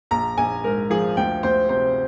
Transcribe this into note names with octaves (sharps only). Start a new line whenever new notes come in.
A#1 A#5
A#1 G#5
G#2 A#4
F3 G#4
D2 G5
D2 C5
C3 C5